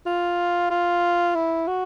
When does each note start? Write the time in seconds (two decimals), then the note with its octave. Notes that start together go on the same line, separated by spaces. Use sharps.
0.06 F4
0.70 F4
1.35 E4
1.68 F#4